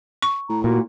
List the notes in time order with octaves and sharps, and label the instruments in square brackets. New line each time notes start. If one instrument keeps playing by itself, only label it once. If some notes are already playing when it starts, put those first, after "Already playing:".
[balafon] C#6
[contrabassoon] A2 [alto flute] A#5
[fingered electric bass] A#2 [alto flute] F#4